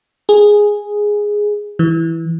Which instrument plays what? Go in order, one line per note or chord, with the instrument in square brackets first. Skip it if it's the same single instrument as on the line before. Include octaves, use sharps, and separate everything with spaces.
[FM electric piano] G#4
E3